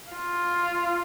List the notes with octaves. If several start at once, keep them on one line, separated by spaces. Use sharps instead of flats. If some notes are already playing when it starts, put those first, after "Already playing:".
F4